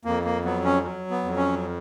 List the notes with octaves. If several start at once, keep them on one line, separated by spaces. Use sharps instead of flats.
F2 A#3
A#3
F#3 B3
C#4
F#3
B3
F2
C#4